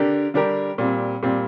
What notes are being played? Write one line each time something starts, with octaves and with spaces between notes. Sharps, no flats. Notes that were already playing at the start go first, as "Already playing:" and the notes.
Already playing: D3 D4 G4 A#4
D3 G3 D4 G4 A#4
A#2 G3 C4
A#2 G3 C4